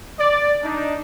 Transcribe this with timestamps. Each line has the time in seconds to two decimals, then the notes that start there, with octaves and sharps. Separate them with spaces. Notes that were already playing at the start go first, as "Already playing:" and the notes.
0.20 D5
0.63 D4 D#4